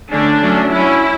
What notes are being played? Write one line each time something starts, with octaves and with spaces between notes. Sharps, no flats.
D3 A3 C#4 D4
F#3 A3 C#4
F#3 C#4 E4